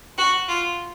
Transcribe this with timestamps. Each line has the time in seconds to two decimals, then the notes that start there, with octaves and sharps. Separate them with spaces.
0.18 F#4
0.48 F4